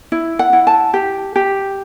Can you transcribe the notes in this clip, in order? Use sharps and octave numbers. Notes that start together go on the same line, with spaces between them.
E4
F#5
E4
A5
G4
G4